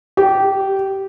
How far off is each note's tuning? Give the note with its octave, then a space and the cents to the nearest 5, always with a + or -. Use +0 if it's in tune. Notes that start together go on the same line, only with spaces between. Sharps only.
G4 -15